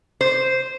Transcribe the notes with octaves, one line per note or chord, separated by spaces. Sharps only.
C5